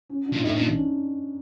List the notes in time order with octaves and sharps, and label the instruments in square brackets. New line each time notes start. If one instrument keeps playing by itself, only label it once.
[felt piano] C#4
D4
[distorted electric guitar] A#2
[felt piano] D#4
[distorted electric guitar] A2
[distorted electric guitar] A#2 [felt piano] D4
[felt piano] C#4